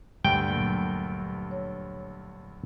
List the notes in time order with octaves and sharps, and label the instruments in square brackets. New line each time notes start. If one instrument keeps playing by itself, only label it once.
[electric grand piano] D2 G2 [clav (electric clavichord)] G5
[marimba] A#2 F#3 A#3
C#5